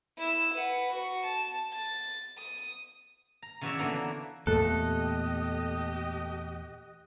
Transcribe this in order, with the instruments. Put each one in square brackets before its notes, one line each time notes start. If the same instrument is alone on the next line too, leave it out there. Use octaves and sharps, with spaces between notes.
[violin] E4 E6
B4 F#5
F#4
A5
A6
D#6
[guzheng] A#5
C#3 E3 F#4 C#5 D5 E5
D3 E3 A#3 B3
[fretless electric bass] E2 A#2 A3 [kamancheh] G4 D#5 [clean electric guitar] A4 [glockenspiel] F#6